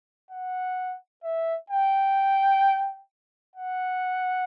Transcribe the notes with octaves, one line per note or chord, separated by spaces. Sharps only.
F#5
E5
G5
F#5